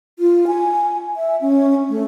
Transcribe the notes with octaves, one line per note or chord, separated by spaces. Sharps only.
F4
G#5
E5
C#4
A3